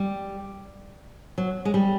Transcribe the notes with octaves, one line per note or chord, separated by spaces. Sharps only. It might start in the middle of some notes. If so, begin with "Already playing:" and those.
Already playing: G3
F#3
G#3
G3